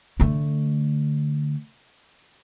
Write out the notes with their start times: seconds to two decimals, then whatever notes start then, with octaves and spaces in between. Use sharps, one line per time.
0.20 D3 A3